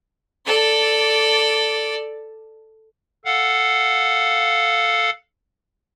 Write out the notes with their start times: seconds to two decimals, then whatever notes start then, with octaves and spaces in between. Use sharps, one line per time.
0.45 A4 D5
3.25 A4 F5 F#5